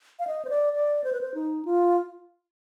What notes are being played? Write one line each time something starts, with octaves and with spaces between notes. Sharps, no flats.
F5
D#5
C5
D5
D5
C5
B4
C5
D#4
F4